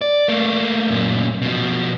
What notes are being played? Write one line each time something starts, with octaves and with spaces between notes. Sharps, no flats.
D5
A3 A#3
F#2 A#2
B2 F3